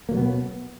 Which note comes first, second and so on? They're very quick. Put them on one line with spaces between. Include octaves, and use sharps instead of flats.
A#3 F#3 B2 B3